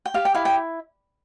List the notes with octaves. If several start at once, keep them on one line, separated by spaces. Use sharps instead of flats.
G5
G4 F5
G5
E4 F5
G5